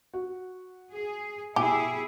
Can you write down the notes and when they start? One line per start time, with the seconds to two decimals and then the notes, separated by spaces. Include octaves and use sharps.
0.14 F#4
0.91 G#4
1.56 B2 E4 G4 G#4 E5 G#5 B5